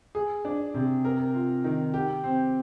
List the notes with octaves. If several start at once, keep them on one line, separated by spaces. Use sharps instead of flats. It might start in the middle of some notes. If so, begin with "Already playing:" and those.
G#4
D4
C3
A#4
F4
D#3
G4
C4